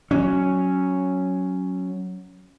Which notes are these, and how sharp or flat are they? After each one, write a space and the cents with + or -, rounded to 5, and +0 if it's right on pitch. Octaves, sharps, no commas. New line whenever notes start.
F#3 +0 C#4 +0